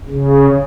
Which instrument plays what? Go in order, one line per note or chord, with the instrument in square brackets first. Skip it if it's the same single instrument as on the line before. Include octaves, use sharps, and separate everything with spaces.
[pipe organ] C#3